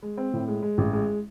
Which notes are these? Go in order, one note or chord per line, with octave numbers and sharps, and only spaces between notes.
G#3
C4
A2
G#3
G#3
A1
G#3